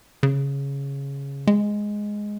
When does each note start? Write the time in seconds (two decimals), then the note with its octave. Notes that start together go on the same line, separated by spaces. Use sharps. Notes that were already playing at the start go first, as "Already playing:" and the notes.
0.23 C#3
1.47 G#3